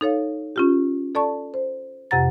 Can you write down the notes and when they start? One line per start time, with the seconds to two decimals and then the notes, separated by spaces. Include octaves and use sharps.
0.01 D#4 A4 C#5 F5
0.56 C#4 F4 G4
1.15 A4 D5 A5 C#6
1.54 C5
2.11 F2 C3 G4 F#5 A#5 A6